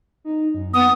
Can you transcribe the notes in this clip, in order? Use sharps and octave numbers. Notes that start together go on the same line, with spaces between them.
D#4
F#2
B3 D#6